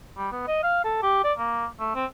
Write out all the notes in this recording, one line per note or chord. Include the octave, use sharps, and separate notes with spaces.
G3
B3
D#5
F5
A4
G4
D5
A#3
A3
C4